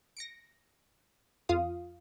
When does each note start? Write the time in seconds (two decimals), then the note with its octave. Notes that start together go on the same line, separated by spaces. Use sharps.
0.17 A#6 C#7 D7
1.49 F2 F4 F5 D#6